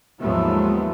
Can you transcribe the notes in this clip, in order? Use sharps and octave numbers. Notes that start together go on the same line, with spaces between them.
D#2 G#2 F3 F#3 A3 B3